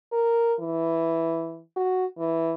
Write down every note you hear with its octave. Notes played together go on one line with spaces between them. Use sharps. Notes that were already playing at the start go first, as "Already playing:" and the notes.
A#4
E3
F#4
E3